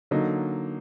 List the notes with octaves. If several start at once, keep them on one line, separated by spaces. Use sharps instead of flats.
D3 F#3 A#3 D#4